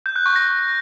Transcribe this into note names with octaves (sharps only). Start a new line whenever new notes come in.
G6
F#6
C#6
A#6